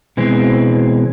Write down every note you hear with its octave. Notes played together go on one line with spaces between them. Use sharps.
B2 E3 G#3 C4